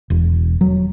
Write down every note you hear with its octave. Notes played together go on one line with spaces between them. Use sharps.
E1
F#3